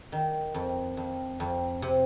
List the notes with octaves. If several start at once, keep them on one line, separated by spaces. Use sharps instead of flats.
D#3
F2
F2
F2
C3